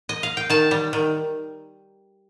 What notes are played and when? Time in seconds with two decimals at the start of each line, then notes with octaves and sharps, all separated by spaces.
0.09 D#5
0.23 F5
0.37 G5
0.50 D#3 A5
0.71 G3
0.93 D#3